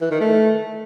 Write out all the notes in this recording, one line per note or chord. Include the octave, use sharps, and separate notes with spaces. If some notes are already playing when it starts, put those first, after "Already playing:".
E3
D#3
A3